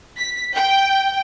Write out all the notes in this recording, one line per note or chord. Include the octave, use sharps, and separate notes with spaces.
B6
G5